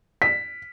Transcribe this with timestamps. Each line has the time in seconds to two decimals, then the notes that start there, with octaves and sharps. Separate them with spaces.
0.22 B6